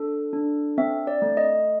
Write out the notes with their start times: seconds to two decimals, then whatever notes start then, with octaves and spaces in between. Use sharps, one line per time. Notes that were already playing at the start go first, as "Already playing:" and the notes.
Already playing: D4 A4
0.33 D4
0.78 C4 E5
1.07 D5
1.22 A3
1.37 D#5